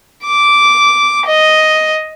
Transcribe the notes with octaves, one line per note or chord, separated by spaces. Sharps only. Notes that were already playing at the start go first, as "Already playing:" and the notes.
D6
D#5